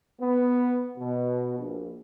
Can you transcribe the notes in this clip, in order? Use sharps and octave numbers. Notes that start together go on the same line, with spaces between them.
B3
B2
A#1